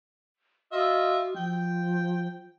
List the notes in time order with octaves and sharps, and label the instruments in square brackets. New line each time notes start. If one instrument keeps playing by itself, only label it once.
[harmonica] F4 D#5 E5 [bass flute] F#4
[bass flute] F3 [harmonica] G5